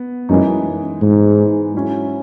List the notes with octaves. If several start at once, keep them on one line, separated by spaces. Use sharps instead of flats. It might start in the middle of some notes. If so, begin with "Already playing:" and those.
Already playing: B3
F#2 E3 G#3 D#4
G#2
F#3 C#4 E4